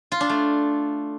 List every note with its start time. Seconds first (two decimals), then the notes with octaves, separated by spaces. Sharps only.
0.12 F4
0.21 D4
0.29 A3